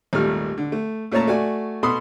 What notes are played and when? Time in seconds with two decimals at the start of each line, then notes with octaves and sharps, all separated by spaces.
0.13 G#1 D#2 A#2 G3 A3 F6
0.57 D3
0.72 A3
1.12 A#2 A3 C#4 C#5 A5 A#5
1.27 A3 F#4 D5 G#5
1.83 B2 A4 B5 C6 D#6